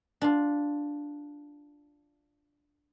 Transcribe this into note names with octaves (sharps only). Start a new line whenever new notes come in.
D4 F4